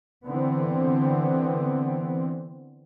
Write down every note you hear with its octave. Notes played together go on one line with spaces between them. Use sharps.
D3 E3 B3 C4